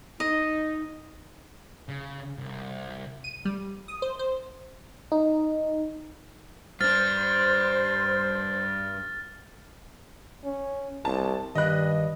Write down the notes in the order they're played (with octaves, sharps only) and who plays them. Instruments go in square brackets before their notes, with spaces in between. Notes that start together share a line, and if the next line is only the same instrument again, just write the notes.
[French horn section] D#4 [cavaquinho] D#5
[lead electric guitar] C#3
C2
[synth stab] D#7
G3
D#6
C5
C5
[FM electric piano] D#4
[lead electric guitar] G2 D4 [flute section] C5 [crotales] F6 A6
[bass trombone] C#4
[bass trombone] C2 [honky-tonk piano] A5
[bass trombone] G2 [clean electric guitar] D#3 D5 B5 [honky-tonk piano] D#5 F#6